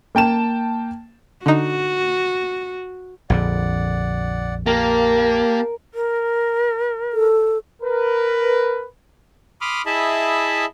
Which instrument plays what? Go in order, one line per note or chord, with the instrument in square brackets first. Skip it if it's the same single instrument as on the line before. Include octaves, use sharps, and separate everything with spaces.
[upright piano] A#3 G5 A5 E7
[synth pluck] D3 D#4 [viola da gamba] F#4
[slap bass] A#1 F2 D3 [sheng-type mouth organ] D5 F#5
[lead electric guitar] A#3 [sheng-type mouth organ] G4 F5 A5 [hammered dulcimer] A#4
[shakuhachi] A#4
[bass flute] A4
[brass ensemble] A#4 B4
[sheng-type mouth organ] B5 C6 D6 D#6 F6
E4 G#4 D#5 E5 A5 B5